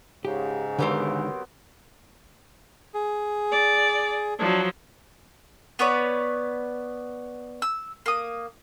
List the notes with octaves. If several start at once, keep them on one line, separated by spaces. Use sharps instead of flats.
G#2 C#3 G4
D3 D#3 F#3 G#3 B3 C4 G4 A#4
G#4
D5
F3 F#3 D4
B3 B4 C#5 D5
E6
A#3 D#6